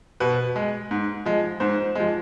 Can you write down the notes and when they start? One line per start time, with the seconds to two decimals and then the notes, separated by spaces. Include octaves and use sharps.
0.20 B2 B4
0.56 G#3
0.91 G#2
1.25 F3 G#3
1.60 G#2 C5
1.95 F3 G#3